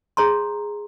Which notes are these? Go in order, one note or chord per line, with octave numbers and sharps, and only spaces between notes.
G#4 C#5 A#5 C6